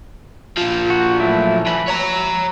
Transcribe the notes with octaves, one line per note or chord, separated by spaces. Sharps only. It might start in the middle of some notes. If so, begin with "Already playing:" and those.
A#2 F3
F#4
F#3 A3 E4
E3 B5
C#5 A#5